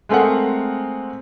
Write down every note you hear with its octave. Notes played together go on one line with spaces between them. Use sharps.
G#3 A3 C4 A#4 F#5